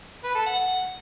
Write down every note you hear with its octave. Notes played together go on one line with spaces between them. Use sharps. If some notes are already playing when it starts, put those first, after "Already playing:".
B4
A4
F#5